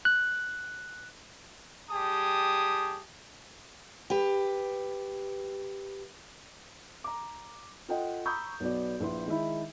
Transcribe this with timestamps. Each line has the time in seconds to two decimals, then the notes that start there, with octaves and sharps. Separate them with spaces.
0.05 F#6
1.90 G3 G4 G#4 A5 D#6
4.10 G4 B4
7.04 A#5 D6
7.89 F4 A4 D#5 F#5 G5
8.25 A#5 B5 C#6 D#6 E6 G6
8.60 B1 B3 F#4 D5
9.00 A#1 E4 B4 C6
9.26 D#3 G#3 D#4 E4